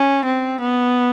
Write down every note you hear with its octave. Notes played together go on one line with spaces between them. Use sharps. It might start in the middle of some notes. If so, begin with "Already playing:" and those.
Already playing: C#4
C4
B3